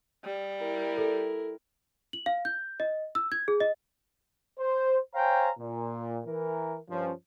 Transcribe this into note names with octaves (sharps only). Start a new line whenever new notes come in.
G3
E4 A#4
A4
F#7
F5
G6
D#5
E6
G#6
G#4
D#5
C5
C5 C#5 F5 G5 G#5 A#5
A#2
E3 A#4
G2 F3 C#4